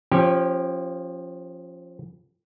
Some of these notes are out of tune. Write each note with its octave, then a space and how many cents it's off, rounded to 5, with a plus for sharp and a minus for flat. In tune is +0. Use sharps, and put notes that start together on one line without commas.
F3 +0 C#4 -25 G4 +0